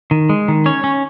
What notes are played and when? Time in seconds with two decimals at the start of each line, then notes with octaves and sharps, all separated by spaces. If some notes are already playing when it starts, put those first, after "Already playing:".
0.11 D#3
0.29 G#3
0.48 D#3
0.66 C#4 C#5
0.84 C#4